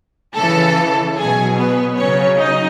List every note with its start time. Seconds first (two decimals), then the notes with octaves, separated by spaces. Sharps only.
0.36 C#3 E3 A4 A5
1.16 B2 F#3 G#4 G#5
1.57 B3 B4
1.97 C#3 F#3 C#4 C#5
2.37 D#4 D#5